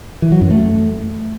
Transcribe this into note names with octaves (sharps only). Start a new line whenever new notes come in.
E3
F#3
F#2
A3